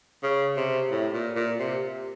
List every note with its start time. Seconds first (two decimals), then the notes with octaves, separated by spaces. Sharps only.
0.23 C#3
0.56 C3
0.91 A2
1.13 A#2
1.36 A#2
1.59 C3